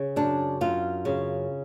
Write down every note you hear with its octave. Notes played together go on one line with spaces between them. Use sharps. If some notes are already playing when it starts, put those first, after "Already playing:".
Already playing: C#3
F#2 D4
F#2 F4
C#3